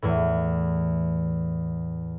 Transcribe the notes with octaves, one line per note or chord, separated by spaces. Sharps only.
E2 A2